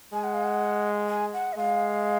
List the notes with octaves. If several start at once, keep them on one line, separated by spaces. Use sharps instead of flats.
G#3 G#5
F#5
F5
F#5
G#5
F#5
D#5
G#3 F5